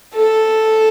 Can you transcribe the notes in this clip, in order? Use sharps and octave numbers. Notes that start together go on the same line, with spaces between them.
A4